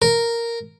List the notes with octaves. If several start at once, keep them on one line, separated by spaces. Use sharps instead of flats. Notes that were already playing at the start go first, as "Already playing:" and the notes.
A#4